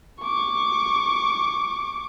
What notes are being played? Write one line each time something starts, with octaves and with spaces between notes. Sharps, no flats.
C#6 D6